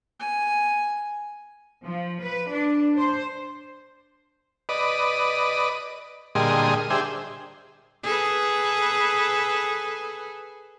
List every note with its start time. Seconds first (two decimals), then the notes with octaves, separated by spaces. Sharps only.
0.20 G#5
1.84 F3
2.21 B4
2.50 D4
2.98 C5
4.69 B4 D5 D#5
6.35 A#2 D3 G3 G#4 D#5 C6
6.90 D4 G4 G#4 C5 E5
8.03 G#4 A4 B4